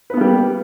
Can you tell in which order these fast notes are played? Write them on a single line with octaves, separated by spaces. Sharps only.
B4 B3 A#3 G3